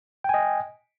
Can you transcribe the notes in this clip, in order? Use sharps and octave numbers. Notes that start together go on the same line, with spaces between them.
D#5 G5 G#5